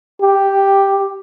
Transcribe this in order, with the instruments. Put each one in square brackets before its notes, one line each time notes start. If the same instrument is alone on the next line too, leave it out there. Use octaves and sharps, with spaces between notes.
[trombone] G4